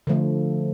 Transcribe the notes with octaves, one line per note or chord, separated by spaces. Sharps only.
D3 F3 A3